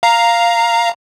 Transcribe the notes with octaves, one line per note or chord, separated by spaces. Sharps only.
F5 A#5